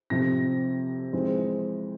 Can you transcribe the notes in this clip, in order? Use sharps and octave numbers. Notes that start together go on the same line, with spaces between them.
F2 C3 F3 C4 A#6
F2 E3 G#3 C4